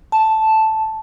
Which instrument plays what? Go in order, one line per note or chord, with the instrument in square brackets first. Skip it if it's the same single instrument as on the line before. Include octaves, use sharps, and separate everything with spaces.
[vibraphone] A5